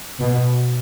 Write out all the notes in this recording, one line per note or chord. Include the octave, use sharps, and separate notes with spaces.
B2